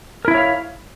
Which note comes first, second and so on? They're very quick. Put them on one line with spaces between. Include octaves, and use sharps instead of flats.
A#4 E4 E5 C#5 F5